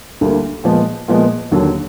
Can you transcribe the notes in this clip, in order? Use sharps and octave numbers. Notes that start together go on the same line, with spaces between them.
D2 D3 G3 A#3
A#2 F3 G#3 B3
A#2 F3 G#3 B3
D#2 D3 F#3